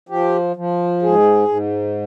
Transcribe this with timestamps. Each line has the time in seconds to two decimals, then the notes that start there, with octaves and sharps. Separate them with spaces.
0.09 F3 G4
0.56 F3
1.02 G#2 G#4
1.48 G#2